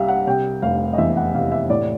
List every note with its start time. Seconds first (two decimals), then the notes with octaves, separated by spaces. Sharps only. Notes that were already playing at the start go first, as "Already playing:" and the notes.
Already playing: C2 G3 E5 F5
0.08 F#5
0.27 C3 G5
0.62 F1 F5
0.93 D#5
0.98 E2 E5
1.17 F#5
1.34 C3 F5
1.51 E5
1.70 A2 D5